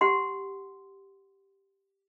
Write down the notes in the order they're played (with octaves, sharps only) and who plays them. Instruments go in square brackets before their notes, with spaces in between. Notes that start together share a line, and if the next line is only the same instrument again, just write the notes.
[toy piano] G4 F#5 C6